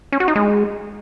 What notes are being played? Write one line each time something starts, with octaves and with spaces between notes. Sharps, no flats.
C#4
F#4
D#4
G#3